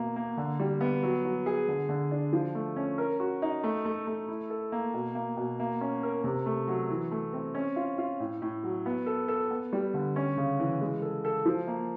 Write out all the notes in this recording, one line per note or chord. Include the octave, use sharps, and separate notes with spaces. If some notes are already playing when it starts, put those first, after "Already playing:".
Already playing: B2 A#3
A#3
D3
G3
B3
F#3
F#3
G#4
D3
D3
D4
F3
A3
C#4
A#4
F#4
D#4
A3
A3
A3
E4
A4
A#3
B2
A#3
B2
A#3
C#4
A#4
C3
A3
F#3
E3
A3
C4
C#4
F4
F4
A2
A2
F#3
B3
A4
A4
B3
G3
D3
C#4
C#3
E3
G#3
A4
A4
F3
A#3